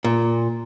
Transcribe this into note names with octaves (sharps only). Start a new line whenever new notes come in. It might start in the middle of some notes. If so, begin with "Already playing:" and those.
A#2